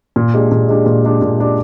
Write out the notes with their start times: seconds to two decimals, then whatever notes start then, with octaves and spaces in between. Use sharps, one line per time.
0.16 A#2
0.34 G#3 D4 G4
0.51 A#2
0.68 G#3 D4 G4
0.86 A#2
1.04 G#3 D4 G4
1.22 A#2
1.38 G#3 D4 G4